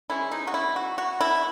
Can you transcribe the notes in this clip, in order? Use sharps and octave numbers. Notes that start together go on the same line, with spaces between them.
E3 G#3 C#4 E4
D#4
F#4
E4
F#4
F#4
E4